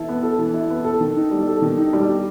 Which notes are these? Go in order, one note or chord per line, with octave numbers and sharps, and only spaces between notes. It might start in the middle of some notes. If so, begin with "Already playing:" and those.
Already playing: E3 E4 A4
B3
A4
E3
E4
B3
A4
D#3
D#4
G3
A4
D#3
D#4
G3
G4